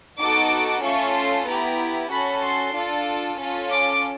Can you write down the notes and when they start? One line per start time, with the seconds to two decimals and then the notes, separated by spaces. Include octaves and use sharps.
0.19 B3 D#4 F#4 A4 D6
0.83 A3 C#4 F4 A4 C#6
1.15 C6
1.47 B3 E4 G4 A#5
2.10 C#4 F#4 A4 B5
2.43 C6
2.75 D4 F4 A4
3.38 C#4 F4 A4
3.70 D6